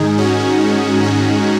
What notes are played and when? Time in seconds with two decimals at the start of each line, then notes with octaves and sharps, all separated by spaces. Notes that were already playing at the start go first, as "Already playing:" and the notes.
Already playing: G#2 D#3 D#4 G#4
0.18 C#4 F#4
0.60 D#4
1.03 C#4 F#4